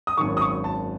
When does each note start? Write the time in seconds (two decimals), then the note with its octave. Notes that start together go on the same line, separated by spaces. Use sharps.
0.07 D#6
0.17 G#1 F#2 D#3 C#6
0.37 D#6
0.41 C#6
0.64 A5